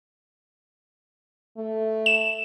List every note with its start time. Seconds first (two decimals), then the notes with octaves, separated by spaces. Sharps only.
1.57 A3
2.06 E7